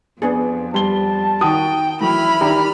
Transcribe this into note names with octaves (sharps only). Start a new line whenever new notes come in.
F2 B3 D4 G#4
G3 A5 C6 G7
D#3 F#4 G5 D#6
E3 F#3 A3 E4 B5 F6
D#3 D4 G4 A#5